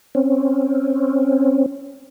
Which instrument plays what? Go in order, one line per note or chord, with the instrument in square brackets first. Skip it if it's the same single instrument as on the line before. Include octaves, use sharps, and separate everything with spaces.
[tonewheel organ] C4 C#4